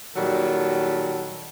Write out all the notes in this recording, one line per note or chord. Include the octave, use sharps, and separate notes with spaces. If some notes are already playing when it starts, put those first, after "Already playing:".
A#2 D#3 F#3 G3 A4